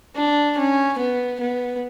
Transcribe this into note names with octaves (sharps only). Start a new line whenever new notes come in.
D4
C#4
B3
B3